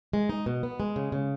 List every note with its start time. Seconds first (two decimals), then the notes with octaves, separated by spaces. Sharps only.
0.13 G#3
0.29 D#4
0.46 B2
0.63 B3
0.80 G#3
0.96 C#3
1.12 C#3